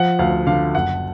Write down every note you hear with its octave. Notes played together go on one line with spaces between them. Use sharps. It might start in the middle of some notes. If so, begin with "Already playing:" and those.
Already playing: F3 F#5
D2 F5
D3 F5
F#1 F#5